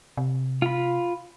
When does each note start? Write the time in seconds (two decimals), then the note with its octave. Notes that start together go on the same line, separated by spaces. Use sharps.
0.17 C3
0.62 F4 B5